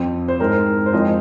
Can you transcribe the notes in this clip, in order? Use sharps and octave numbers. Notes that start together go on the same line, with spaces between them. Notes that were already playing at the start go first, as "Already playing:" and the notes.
Already playing: F2 F3 C4
C5
G#2 G#3 C4 A#4
C5
F2 F3 G#3 C4 D#5